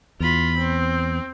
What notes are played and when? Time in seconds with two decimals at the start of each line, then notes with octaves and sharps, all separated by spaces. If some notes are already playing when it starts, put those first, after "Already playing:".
0.20 E2 F4 B5
0.58 C4